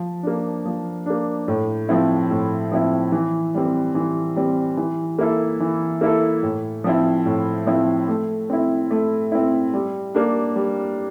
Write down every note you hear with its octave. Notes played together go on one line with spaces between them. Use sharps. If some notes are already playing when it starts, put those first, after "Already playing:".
Already playing: F3
A#3 D4
F3
A#3 D4
A2
F3 C4 E4
A2
F3 C4 E4
E3
G3 C4
E3
G3 C4
E3
A#3 E4 A4
E3
A#3 E4 A4
A2
F3 C4 E4
A2
F3 C4 E4
A3
C4 E4
A3
C4 E4
G3
A#3 D4
G3